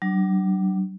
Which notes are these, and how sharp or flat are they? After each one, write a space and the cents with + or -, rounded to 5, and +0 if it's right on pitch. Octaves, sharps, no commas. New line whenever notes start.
F#3 +45 D4 +20